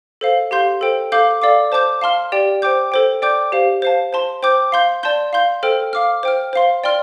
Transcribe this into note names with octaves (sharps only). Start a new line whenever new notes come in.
A4 C5 F5
G4 F5 C6 G6
A4 C5 G5
A4 F5 D6 G6
A4 D5 F5 D6
C5 A5 D6 G6
F5 A5 C6 F6
G4 D5 G5
C5 G5 D6 G6
A4 C5 G5
D5 G5 D6 G6
G4 C5 F5
C5 F5 A5
C5 A5 C6
C5 G5 D6 G6
F5 C6 G6
D5 A5 C6 G6
F5 C6 G6
A4 C5 G5 F6
F5 D6 F6
C5 G5 F6
C5 F5 C6
D5 G5 C6 F6